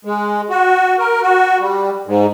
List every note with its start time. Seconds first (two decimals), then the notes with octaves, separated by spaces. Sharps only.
0.05 G#3
0.50 F#4
0.99 A#4
1.21 F#4
1.60 G3
2.06 G#2